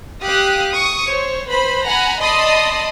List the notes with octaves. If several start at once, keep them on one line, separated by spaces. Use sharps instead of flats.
G4 F5 D#6 F#6
C#6 D#6
C5 C#5
B4 C5 B5
F#5 G#5 A#5 B5
D5 D#5 A5 B5 C6 D#6